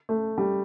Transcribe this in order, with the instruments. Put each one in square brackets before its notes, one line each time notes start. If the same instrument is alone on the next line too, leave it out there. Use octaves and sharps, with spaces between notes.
[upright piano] A3
G3